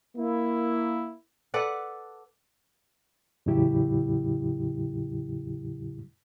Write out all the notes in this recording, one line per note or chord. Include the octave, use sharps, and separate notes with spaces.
A#3 E4
A4 B4 D5 F#5
E2 A2 C#3 F#3 E4 G4